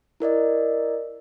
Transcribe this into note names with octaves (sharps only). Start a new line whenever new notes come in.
E4 A#4 D5 D#5